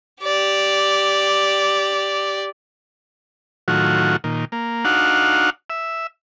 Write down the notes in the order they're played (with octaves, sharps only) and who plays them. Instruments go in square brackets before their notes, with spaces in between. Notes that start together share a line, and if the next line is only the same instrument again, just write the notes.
[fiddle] G4 D5
[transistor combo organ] A2 D#3 F#3 F4 F#4
A#2 D#3
A#3
D4 D#4 F#4 F5 F#5
E5